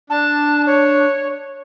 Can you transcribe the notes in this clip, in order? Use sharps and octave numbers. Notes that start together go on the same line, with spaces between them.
D4 A5
C#5